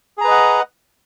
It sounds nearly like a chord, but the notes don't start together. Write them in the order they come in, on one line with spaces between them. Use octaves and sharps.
G#4 A#5 B4 D#5 F#5